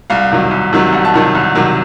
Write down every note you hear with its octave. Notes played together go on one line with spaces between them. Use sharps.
C2 F5
C3 D#3 F#3
C2
C3 D#3 F#3
C2 F#5
A5
C3 D#3 F#3 F#5
C2
C3 D#3 F#3